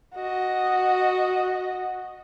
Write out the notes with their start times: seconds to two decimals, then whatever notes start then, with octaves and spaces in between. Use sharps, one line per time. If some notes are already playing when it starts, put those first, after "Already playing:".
0.15 F#4 D#5